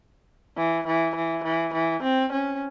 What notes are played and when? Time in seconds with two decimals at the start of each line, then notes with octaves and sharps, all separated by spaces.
0.57 E3
0.87 E3
1.15 E3
1.44 E3
1.74 E3
2.03 C4
2.32 C#4